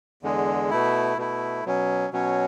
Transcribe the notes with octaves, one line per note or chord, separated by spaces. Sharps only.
E2 D3 G#3
B2 A3 E4
B2 A3 E4
B2 F#3 C#4
B2 F#3 C#4